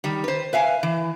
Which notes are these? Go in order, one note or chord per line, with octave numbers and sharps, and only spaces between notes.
D#3 G3
B4 C5
B4 E5 F5 G#5
E3